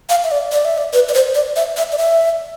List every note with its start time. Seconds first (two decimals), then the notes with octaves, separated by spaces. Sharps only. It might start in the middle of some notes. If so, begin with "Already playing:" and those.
0.09 F5
0.24 E5
0.31 D5
0.52 D5
0.65 E5
0.78 D5
0.93 B4
1.09 D5
1.14 C5
1.35 D5
1.56 E5
1.77 E5
1.92 D5
1.98 E5